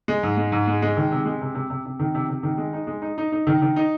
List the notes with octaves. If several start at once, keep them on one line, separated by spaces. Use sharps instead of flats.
G#3
G#2
G#3
G#2
G#3
G#3
D#3
C3
G#3
C3
C3
C3
C3
D#3
C3
C3
D#3
G#3
D#4
G#3
D#4
D#4
D#4
D#3
D#3
D#4